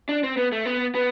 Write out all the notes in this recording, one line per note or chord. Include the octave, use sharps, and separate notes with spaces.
D4
C4
B3
A3
B3
B3